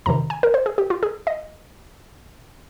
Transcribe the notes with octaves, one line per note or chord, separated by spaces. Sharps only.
F2 C3 D#3 A#5
G#5
A#4
C5
G#4
G4
F4
G#4
D#5